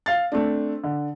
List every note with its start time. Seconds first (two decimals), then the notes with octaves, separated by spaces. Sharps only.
0.06 F5 A6
0.32 A3 C4 D4
0.84 D3